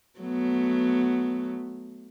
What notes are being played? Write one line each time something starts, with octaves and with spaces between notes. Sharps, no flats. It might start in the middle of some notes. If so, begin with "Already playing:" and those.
F#3 A3 B3